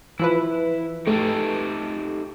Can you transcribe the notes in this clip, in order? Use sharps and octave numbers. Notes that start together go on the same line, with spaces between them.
E3 F3 E4 B4
A3 D#4 G4 A4